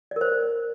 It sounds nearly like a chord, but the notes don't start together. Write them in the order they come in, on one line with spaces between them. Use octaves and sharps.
D5 A#4 C5